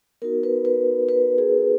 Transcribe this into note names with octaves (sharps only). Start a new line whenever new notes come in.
B3 D#4 F#4 A#4
B4
B4
B4
G#4